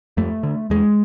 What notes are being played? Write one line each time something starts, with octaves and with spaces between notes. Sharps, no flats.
F2 A3
D3
E2 G#3